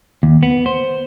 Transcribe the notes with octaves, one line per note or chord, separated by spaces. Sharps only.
D#2
B3
C5